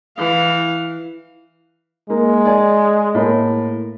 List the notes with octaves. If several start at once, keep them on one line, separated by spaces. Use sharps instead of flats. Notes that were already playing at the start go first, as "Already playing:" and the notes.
E3 F5
G#3 A#3
D5 G#5
A2 A#3